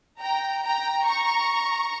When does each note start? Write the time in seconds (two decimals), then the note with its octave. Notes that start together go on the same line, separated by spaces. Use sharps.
0.21 G5 A#5
0.63 G5 A#5
1.05 A#5 C#6